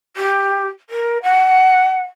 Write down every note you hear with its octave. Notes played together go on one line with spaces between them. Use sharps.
G4
A#4
F#5